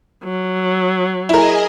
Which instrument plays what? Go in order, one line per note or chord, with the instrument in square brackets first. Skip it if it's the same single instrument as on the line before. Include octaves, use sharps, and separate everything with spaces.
[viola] F#3
[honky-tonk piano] E4 A#4 [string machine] G#4 D#5 G#5